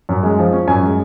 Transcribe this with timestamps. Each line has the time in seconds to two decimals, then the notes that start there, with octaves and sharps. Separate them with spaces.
0.09 F#2
0.23 G#3
0.39 F3
0.53 C#4
0.67 F#2 G#5
0.83 G#3